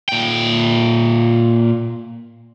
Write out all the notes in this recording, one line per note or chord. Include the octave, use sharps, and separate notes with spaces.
A#2 G5